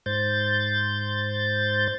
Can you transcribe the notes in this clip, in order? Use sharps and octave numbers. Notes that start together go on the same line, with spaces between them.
G#2 C5 G6 A6